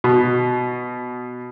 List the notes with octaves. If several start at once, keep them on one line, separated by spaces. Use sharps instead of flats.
B2